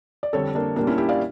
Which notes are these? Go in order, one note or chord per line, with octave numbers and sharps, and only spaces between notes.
D5
F2 D3 G3 A4 C#5
A#3 D4
A#2 G3 A#3 D4
C#4 E4
E4 G4
D5 F5